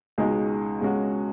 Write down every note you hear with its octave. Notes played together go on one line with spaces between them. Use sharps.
C#2 B2 G#3 D#4 G#4
C#2 B2 G#3 C#4 F#4